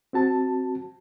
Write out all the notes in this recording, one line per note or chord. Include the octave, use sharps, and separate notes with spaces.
C4 F#4 A5